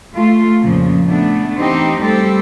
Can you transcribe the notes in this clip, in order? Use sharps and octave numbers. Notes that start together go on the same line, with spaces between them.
A3 F4
F2 A#2 C#3 F3
A3 B3 D4
E3 C4 D#4 G4
G3 A3 C4 G4 A4